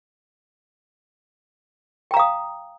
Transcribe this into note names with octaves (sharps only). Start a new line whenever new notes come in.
F5 G5 A#5 D#6